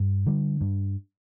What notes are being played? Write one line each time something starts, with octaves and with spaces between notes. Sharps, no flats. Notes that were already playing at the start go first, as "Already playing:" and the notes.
Already playing: G2
D3 G3
G2